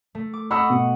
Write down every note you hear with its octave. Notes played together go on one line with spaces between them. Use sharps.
A3
D6
D#5 F#5 B5 C#6 E6
B2